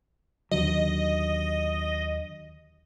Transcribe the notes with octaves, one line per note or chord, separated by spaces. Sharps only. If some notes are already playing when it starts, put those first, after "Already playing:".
D#2 D3 F#3 D#5